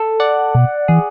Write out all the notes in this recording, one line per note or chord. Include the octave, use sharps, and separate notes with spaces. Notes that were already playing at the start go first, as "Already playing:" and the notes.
Already playing: A4
D5 F#5
B2
E3 G#4